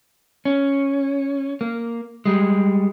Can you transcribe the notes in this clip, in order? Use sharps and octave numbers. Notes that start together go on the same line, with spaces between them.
C#4
A#3
G3 G#3